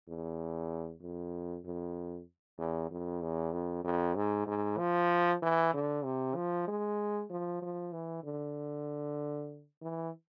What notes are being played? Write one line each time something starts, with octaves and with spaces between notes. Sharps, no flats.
E2
F2
F2
E2
F2
E2
F2
F2
G#2
G#2
F3
E3
D3
C3
F3
G#3
F3
F3
E3
D3
E3